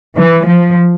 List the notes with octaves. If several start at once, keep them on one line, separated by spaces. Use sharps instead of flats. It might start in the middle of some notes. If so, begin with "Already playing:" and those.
E3
F3